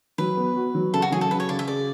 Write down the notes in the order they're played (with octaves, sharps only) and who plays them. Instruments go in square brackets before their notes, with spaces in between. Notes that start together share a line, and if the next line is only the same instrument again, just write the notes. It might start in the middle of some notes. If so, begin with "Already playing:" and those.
[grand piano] F#3 [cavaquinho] B4
[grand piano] B3
F#4
F#3
[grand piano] C#3 [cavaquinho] A4
[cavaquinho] F#4
[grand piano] F#3 [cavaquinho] G#4
[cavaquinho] A4
[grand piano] C#3 [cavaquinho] B4
[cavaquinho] C#5
[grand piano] C#3 [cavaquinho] D5
[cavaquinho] E5
[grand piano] G#4 [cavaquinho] D5